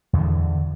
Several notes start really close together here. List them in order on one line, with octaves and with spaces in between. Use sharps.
E2 D3 F3 E3